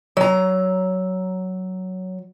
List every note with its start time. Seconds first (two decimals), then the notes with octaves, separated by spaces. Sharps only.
0.17 F#3 A#5